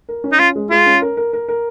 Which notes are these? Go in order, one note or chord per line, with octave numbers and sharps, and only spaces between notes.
A#4
C#4
D#4
C#4 F4
G#3
G#3 F4
C#4
A#4
A#4
A#4
A#4